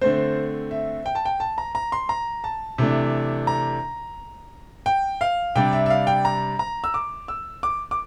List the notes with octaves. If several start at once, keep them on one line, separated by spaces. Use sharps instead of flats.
D3 A3 C4 C5
E5
G5
A5
G5
A5
A#5
A#5
C6
A#5
A5
C3 E3 A3 D4
A#5
G5
F5
C3 G3 D4 G5
E5
E5
F5
G5
A#5
A#5
E6
D6
E6
D6
D6